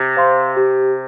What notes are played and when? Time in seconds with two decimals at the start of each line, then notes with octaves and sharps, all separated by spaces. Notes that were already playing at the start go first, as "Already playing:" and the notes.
Already playing: C3
0.17 C5 F5 C6
0.57 G4